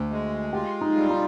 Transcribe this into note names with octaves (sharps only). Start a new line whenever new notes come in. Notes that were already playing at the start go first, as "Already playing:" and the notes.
Already playing: D2
G#3
F4 G4
D#4
G3
D#4